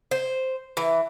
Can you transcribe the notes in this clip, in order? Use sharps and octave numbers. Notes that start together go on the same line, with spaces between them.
C5
E3